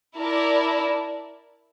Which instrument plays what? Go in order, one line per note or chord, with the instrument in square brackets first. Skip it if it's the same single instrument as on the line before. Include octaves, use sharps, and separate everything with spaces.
[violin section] E4 A#4 D5 A5